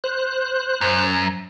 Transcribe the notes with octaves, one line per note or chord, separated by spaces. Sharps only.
C5 F#6
F#2